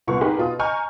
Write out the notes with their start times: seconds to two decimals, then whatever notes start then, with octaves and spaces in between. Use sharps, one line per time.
0.07 C2 A#2 B3 C#6
0.21 D#4 G4 G#4 A#4 B4
0.38 B2 F4 D#6
0.59 D#5 G#5 A#5 C#6 F6 G6